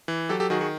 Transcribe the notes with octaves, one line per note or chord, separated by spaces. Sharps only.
E3
F#3 G4 A4
G4 A4
D#3 F#4 G#4
F#4 G#4